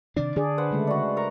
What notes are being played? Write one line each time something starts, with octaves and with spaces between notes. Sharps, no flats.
C3 D#3 D4 D5
D3 D4 G#4 D5
B4 C5 F#5
C#3 G#3 A3
D4 F#4
A#4 A#5 C#6